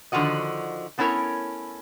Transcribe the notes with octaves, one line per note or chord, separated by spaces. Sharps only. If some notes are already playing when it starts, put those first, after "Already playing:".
D3 D#3 F3 F#4 D#5
A3 B3 C#4 E4 A#4 C#5